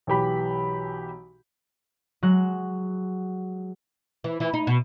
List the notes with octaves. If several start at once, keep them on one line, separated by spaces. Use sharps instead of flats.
B1 E3 G4 B5
F#3 G#3 F#6
E3
E3
D#4
B2